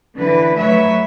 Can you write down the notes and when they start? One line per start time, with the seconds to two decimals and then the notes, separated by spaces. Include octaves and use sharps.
0.18 D3 E3 B4
0.57 F#3 A3 B4 C#5 E5